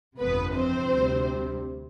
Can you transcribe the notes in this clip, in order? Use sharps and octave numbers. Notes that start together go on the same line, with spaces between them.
G1 F2 C3 F3 B3 B4
C4 C5
D2 C3 G3